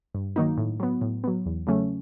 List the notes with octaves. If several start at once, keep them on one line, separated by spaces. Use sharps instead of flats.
G2
D#3 F#3 A#3 D#4
A2
F#3 B3
A2
F#3 B3
E2
C#3 F#3 A3 C#4